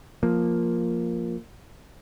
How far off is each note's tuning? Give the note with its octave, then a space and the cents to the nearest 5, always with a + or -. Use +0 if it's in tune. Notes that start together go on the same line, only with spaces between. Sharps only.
F3 +0 A#3 +0